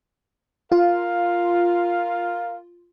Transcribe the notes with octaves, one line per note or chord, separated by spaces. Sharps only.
F4 A#4 F5